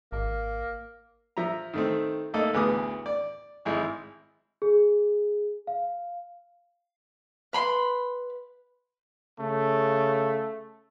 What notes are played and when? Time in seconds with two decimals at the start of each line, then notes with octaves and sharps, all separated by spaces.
0.12 G#1 A#3
1.37 F3 E5 A#5
1.74 D#3 A3 C4
2.34 A3 A#3 D#4 A4 D#5
2.54 A1 D2 B3 G#4 D6 D#6
3.06 D5
3.65 G#1 E4 G#4 E6
4.62 G#4
5.67 F5
7.53 B4 B5 C6
9.40 C#3 A3